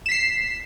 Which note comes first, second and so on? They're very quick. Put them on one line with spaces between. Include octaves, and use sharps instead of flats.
E7 B6 C7